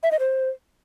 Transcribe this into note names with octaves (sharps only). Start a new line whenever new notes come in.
E5
D#5
C5